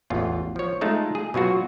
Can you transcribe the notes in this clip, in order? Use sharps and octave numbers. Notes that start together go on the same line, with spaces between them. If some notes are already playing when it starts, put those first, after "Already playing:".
A1 E2 F4
F3 C#5
G#3 A3 D#4 F4 A5
G#4
B2 F#3 F4 F#4